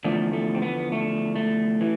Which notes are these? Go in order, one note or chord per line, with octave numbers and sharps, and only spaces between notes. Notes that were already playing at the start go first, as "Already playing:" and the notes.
E2 D3 F3 A3
A3
C4
B3
A3
A3
E3